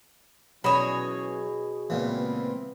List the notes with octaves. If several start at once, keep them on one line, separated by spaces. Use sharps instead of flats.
B2 E3 F#3 C#4 G#4 C#5 B5
C#2 A#2 E3 B3 C4